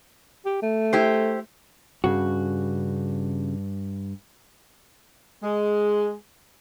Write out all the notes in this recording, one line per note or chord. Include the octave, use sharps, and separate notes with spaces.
G4
A3
E4 G4 C5
G2 C#3 F#4
G#3